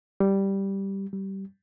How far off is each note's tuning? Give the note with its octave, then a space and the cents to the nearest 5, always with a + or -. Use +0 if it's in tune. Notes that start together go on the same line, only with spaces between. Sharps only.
G3 -5
G3 -20